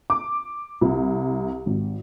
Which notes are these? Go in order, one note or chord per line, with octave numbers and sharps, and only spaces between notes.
D6
C2
G#1